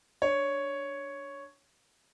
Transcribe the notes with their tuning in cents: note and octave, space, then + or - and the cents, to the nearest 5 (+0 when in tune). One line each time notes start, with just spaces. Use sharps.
D4 +0 C#5 +0